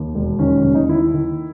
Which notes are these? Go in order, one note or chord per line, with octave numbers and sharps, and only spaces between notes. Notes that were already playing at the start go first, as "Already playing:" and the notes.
Already playing: D#2
E1
D#3 C#4
D#2 C#4
D#4
D#3 E4
D#3